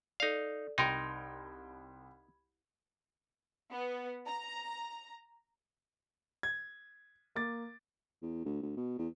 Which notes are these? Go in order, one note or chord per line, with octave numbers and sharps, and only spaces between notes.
D#4 A4 D5 F5
C2 D#4 A#4 G5 B5 C6 G#6
B3
A#5
G#6
A#3 D6 A6
E2
D2
D2
B2
E2